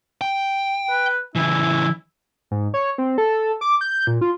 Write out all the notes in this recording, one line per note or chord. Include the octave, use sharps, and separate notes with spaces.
G5
B4
C#3 E3 E4
G#2
C#5
C4
A4
D6
G6
A#2
F4